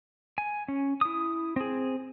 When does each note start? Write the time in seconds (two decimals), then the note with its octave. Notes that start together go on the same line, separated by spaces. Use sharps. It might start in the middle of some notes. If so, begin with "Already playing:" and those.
0.38 G#5
0.68 C#4
1.01 E4 D#6
1.56 C4 G#4